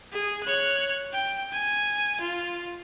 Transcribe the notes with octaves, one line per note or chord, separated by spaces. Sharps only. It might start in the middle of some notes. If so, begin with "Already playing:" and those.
G#4
C#5 F#6
G5
G#5
F4